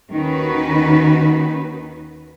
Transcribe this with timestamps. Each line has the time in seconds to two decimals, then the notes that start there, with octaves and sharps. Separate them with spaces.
0.12 D#2 D#3 C#4 D#4 F#4 B4